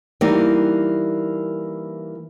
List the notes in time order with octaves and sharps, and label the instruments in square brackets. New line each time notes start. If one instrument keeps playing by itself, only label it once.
[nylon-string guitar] E3 G3 A#3 D#4